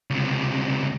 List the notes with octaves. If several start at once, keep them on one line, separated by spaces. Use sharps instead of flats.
C#2 C3